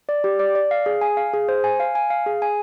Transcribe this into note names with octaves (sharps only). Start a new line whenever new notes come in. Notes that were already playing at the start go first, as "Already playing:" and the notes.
D5
G4
D5
D5
F5
G#4
G#5
F5
G#4
C5
G#5
F5
G#5
F5
G#4
G#5